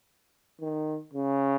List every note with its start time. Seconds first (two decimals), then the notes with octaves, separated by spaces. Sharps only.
0.61 D#3
1.13 C#3